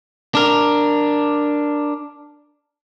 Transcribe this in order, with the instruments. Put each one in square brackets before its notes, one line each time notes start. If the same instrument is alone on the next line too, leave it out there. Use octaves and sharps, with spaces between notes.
[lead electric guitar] D4 A#4